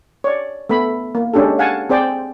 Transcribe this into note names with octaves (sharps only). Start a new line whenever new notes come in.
C#5 D5
A3 B3 B5
A#3
G#3 C#4 D4 G4 A4
F5 F#5 G#5 A5
C4 G#4 C5 D5 G5